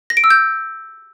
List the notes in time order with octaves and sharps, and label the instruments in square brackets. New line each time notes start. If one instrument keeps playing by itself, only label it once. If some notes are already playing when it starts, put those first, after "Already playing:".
[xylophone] A#6
D7
E6
G6